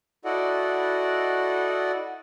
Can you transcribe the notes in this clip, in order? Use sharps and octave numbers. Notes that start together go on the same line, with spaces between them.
E4 F#4 A4 D5 D#5 F#5